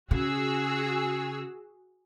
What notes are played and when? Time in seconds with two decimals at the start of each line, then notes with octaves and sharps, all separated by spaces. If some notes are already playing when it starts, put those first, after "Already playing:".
0.11 C#3 F#4 G#4 E6